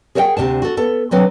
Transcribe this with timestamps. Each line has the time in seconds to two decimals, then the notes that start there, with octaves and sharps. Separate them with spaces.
0.15 G#4 A#4 C#5 E5 F#5 G5
0.37 D2 C3 D4 A5
0.62 F#4 A4
0.77 B3 A4
1.11 D3 F#3 C4 B4